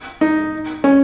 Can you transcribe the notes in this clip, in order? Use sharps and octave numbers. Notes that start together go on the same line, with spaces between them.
D#4
C#4